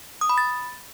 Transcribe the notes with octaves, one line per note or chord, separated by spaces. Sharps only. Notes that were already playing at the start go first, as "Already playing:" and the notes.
D#6
B5
A6